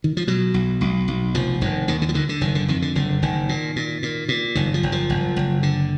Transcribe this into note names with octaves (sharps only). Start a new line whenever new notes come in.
D#3
F3
B2 F#3
B1
B1
B1
F1 F3
F1 D#3
D#2 D#3
D3
F3
D3 D#3
D3
F#1 D#3
D3
F2 D#3
D3
F#1 D3
F#1 D#3
A#2
A#2
A#2
A#2
F#1 D#3
F3
F#1
F3
F#1
F#1
D3